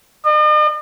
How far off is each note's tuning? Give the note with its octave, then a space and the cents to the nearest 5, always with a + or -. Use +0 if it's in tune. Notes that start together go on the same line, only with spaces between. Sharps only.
D#5 -45